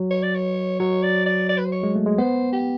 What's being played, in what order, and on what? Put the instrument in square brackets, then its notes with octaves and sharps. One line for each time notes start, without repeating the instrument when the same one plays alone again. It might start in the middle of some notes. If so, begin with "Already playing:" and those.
Already playing: [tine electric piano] F#3
[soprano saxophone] C#5
D5
C#5
[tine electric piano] F#3 [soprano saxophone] C#5
[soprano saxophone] D5
D5
D5
B4
C5
C#5
[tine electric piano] G#3
A3
G#3
[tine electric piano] B3 [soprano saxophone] C5
[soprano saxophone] G4